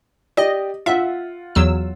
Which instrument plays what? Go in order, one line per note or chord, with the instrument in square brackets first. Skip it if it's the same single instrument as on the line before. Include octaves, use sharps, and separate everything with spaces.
[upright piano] G4 D5 [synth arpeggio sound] D#5
[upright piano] F4 F#5 [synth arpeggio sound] E5
[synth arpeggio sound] E2 F#3 E6